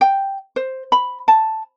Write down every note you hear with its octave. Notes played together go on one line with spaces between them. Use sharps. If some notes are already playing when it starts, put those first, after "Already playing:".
G5
C5
B5
A5